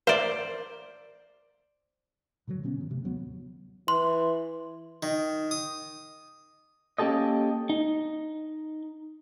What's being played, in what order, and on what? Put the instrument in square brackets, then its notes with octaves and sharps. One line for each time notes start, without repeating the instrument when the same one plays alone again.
[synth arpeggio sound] A#4 E5 [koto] C5 D5
[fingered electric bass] A#2 D3 E3 F#3
B2 D3 B3 C#4
G#2 D#3
A2 C3 A3
D#2 F#3 B3
[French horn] E3 [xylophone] C6
[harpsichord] D#3
D#6
[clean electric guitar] A#3 C#4 G4 A4 D#5
D#4